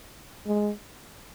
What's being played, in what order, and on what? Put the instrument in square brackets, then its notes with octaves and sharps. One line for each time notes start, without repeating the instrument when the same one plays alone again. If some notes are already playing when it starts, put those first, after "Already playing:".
[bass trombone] G#3